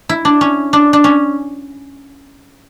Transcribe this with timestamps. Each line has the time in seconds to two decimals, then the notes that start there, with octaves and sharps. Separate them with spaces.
0.09 E4
0.25 D4
0.41 C#4
0.73 D4
0.93 D4
1.04 C#4